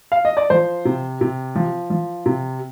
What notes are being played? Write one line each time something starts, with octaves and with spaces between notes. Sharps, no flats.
F5
D#5
D5
F3 C5
C3
C3
F3
F3
C3